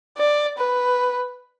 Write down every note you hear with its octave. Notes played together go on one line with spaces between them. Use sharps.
D5
B4